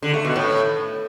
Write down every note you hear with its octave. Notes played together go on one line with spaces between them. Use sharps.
D3
A3
B2
A2